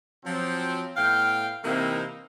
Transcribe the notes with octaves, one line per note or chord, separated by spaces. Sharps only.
F3 F#3 C4
A2 B3 F5 G5
C3 E3 A#3 C4 D#4 E4